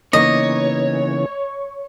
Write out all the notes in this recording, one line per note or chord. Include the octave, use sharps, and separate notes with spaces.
C#3 E3 A#3 B3 D#4 C#5 D#5